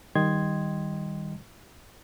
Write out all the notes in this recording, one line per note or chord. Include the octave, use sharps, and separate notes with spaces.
D#3 G3 D#5 G5 C6 G#6